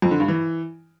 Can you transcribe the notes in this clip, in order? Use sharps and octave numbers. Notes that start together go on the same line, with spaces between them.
F2
D3
G2
E3